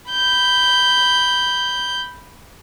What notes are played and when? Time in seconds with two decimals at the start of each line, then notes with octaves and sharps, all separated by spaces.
0.11 B5 G6